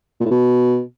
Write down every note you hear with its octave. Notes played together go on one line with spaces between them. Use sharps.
A#2
A2
B2